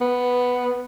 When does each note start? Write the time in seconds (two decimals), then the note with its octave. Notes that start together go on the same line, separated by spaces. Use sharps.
0.01 B3